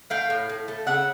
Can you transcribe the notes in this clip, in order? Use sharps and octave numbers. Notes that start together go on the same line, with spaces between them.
A3 F5 G5
A2
A2
A3
C#3 E5 F#5